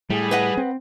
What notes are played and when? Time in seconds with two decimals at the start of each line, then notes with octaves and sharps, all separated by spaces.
0.10 A2 G3 G#4
0.31 B4 D#5 F#5
0.57 C4